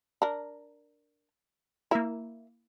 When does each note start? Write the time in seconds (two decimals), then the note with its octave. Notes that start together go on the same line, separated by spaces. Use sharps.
0.22 D4 A#4
1.91 A#3 E4 A#4 E5